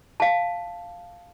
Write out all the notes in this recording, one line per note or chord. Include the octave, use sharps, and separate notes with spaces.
F5 A5